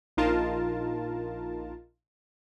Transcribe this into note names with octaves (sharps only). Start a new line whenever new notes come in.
A#1 D#4 F4 A#4 A5